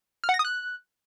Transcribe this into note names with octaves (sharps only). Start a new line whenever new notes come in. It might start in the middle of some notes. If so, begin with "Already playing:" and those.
F6
F#5
A#6
D#6
F#6